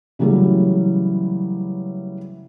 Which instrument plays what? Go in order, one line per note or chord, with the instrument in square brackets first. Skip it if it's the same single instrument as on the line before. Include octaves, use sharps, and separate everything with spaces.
[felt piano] C#3 E3 F#3 G3 A3 E4